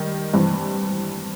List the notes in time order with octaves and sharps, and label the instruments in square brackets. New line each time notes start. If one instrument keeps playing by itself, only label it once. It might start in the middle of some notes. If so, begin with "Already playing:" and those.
Already playing: [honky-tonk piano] D#3 G3
G2 E3 G3 C4